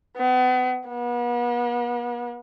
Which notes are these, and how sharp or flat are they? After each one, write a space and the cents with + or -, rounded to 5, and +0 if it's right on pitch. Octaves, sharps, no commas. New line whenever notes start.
B3 +35
B3 -40